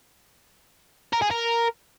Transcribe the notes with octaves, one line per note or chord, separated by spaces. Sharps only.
A#4
G#4
A#4